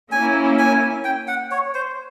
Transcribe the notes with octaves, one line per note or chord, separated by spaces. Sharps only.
A#3 C#4 E4 G#5
G#5
G5
F#5
C#5
C5